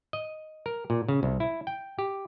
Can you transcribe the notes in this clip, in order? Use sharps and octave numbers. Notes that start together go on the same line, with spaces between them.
D#5
A#4
A#2
C#3
C2
E4
G5
G4